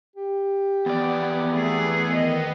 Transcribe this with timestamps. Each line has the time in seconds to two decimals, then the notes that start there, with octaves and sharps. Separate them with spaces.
0.16 G4
0.86 E2 B3 D5
1.53 A3 G#4
2.13 D#3 D#5